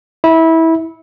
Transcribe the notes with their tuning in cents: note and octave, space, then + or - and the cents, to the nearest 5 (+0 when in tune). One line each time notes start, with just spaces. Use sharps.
E4 -20